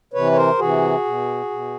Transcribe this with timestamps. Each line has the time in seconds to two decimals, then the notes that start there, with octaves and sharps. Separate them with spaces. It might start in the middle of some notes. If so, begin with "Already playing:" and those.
0.14 C3 E3 B4 C#5
0.32 C#5
0.36 A#4 C5
0.59 C3 E3 F#4 G#4
1.05 B2
1.50 B2